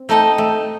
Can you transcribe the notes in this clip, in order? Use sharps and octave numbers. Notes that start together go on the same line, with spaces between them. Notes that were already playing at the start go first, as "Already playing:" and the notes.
Already playing: C4
A3 D#4 A4 D#5 G5
A3